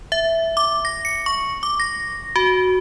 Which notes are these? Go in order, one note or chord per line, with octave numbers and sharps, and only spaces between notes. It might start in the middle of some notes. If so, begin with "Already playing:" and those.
E5
D6
A#6
C#7
C#6
D6
A#6
F#4